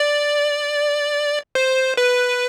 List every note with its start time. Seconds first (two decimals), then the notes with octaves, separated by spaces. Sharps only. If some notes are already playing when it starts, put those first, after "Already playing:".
Already playing: D5
1.55 C5
1.97 B4